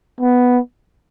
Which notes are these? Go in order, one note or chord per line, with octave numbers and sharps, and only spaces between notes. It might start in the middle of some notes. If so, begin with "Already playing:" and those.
B3